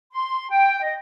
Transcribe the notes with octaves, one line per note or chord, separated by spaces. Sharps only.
C6
G5
D#5